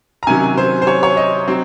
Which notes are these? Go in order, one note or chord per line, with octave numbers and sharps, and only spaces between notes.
A#5
C3 D#3 F#3 C#4 G#5
C5
C5
C#5
C#5
D#5
F#3 C4